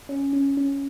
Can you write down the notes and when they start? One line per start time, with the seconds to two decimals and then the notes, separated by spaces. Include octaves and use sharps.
0.09 C#4
0.33 C#4
0.57 C#4